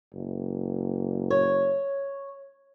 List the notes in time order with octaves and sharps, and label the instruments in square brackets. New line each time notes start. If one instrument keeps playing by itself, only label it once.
[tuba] F#1
[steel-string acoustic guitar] C#5